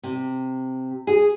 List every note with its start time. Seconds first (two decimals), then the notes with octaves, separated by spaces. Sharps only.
0.03 C3
1.07 G#4